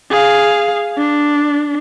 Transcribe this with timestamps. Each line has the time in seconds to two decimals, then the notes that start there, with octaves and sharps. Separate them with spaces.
0.10 G#4 F5
0.98 D4